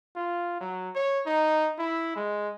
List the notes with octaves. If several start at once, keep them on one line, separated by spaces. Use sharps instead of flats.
F4
F#3
C#5
D#4
E4
G#3